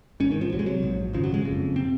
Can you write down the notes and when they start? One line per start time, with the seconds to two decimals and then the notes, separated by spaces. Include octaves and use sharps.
0.20 G#1 G#2 C#4
0.31 D#3
0.41 F3
0.52 C2 C3 F#3
0.59 G#3
0.66 F#3
0.82 A#1 G#2
1.13 G#1 F#2 C#3 F3
1.24 F#3
1.34 G#3
1.45 F#1 F2 C#3
1.76 C3 C4